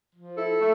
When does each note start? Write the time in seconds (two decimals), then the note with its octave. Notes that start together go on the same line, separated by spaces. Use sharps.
0.14 F3
0.37 E4 A4
0.59 A3